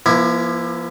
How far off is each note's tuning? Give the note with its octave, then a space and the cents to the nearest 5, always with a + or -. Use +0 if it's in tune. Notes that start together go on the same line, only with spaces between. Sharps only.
F3 -30 A#3 +45 E4 +0